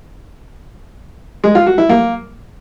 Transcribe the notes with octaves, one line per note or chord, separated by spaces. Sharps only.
G#3
F4
F#4
E4
A#3